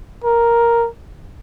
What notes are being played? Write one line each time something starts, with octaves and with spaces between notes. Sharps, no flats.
A#4